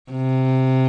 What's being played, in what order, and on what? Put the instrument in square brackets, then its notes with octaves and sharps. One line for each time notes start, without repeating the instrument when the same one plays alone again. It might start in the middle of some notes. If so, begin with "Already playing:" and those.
[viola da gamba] C3